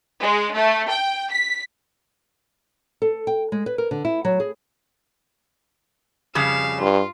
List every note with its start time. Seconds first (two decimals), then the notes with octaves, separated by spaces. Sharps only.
0.21 G#3
0.54 A3
0.88 G5
1.31 B6
3.02 A4
3.27 G5
3.52 G#3
3.66 B4
3.78 A#4
3.91 D3
4.05 E4
4.25 F#3
4.40 G#4
6.35 F2 C#3 G3 F5 E7
6.81 G2 F4